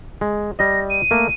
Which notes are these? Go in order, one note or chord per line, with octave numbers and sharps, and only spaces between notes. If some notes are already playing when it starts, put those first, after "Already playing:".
G#3
G3 D#5 A#6
D#7
A3 A#3